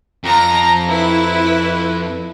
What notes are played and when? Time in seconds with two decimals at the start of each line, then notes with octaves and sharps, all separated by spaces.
0.24 F2 A#5
0.89 E4 B4